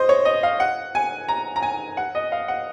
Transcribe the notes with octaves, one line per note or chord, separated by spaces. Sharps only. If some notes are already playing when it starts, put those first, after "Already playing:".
Already playing: C5 D#5
C#5
D#5
F5
F#5
G#5
A#5
A#5
G#5
F#5
D#5
F5
F#5